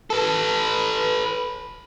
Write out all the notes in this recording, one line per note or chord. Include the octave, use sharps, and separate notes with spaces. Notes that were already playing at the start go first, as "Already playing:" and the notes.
A4 B4